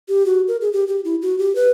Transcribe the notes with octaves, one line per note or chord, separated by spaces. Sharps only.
G4
F#4
A#4
G#4
G4
G4
E4
F#4
G4
B4